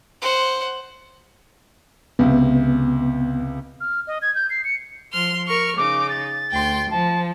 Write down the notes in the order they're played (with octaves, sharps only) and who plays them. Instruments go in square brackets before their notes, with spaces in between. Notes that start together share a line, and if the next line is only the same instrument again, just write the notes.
[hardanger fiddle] C5 F#5
[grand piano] C#2 C3 [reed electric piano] B3
[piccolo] F6
D#5
G#6
G6
C7
C#7
[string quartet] F3 C6 F6
A#4 C#6 F6
[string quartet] C#3 D#4 [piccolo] D6
[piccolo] A6
[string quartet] D2 G5 C6
[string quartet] F3 [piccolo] A5